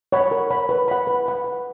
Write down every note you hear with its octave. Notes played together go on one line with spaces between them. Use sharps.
C#5 F#5 B5
A#4
C#5 F#5 B5
B4
F#5 B5
B4
F#5 B5
B4